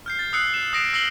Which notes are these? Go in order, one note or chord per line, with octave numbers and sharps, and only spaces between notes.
F6 G6 C7
A6
D#6 E6 F#6 C7 C#7
E7
D#6 F#6 A#6 C7 D7 E7
E6 A#6 C7 C#7 F#7 G7